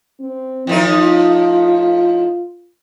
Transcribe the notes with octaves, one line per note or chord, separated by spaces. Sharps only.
C4
A2 E3 F3 D#4
F4